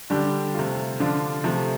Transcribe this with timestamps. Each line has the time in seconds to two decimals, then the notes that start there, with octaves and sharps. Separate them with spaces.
0.10 D3 G3 D4 G4
0.54 C3 A3 F4
1.00 D3 F3 D4 F4
1.44 C3 F3 A3